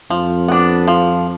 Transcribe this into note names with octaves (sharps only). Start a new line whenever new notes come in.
F2 F3
B3 D4
F3